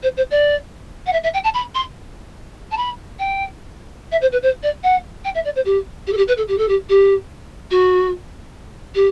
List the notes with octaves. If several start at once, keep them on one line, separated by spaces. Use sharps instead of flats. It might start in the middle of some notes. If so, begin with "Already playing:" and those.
C5
C5
D5
F#5
E5
E5
G5
A5
B5
C6
A5
B5
G5
E5
C5
B4
C5
D5
F#5
G5
E5
D5
C5
G4
G4
A4
G4
B4
A4
G4
A4
G4
G4
F#4
G4